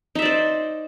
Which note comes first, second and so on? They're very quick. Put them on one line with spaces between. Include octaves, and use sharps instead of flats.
D#4 E5 D5 C5